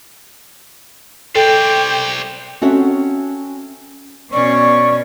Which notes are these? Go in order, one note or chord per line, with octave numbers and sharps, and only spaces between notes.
A4 C5 D5 G5
C4 C#4 F#4 A4 E5 F#5
B2 C#4 D5 C#6